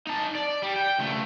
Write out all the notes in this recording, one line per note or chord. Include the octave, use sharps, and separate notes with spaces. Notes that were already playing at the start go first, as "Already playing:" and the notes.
D#4 A5
D5
G3
G5
C#2 A3